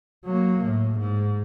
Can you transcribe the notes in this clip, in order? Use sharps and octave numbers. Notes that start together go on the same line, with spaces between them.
F#3 A#3
A2
G#2